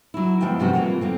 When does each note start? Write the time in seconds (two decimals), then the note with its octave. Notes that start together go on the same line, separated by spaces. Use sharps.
0.14 F#3 E4
0.41 E2 G#2 F3 G#3 E4 G5
0.59 G2 C3 G3 C4 F#4
0.73 E3 A#3 F4
1.01 F#2 D3 C4